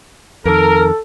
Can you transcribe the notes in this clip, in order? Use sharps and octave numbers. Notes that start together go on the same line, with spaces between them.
F2 D#3 A4 A#4